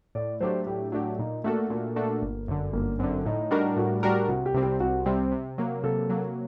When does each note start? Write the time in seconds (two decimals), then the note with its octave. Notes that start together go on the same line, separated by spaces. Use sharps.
0.15 A2 D5
0.40 F#3 A3 D4 G4 C5
0.67 A2 G4
0.92 F#3 A3 D4 F#4 G4
1.19 A#2 D#4
1.44 A3 A#3 D4 F#4 A4
1.70 A#2 A#3
1.96 A3 D4 F#4 A4
2.22 G1
2.48 F#2 D3
2.73 G1 A#3
2.99 F#2 D3 C4
3.25 A2 D#4
3.51 G3 D4 F#4 A#4
3.76 A2 F#4
4.03 G3 D4 F#4 G4 A#4
4.28 C2 F#4
4.46 G4
4.54 C3 G3 C4
4.63 G4
4.80 C2 F#4
5.06 C3 G3 C4
5.32 C3
5.58 F#3 A#3
5.83 C3 A4
6.09 F#3 A#3